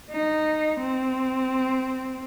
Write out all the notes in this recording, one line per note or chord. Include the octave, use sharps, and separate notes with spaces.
D#4
C4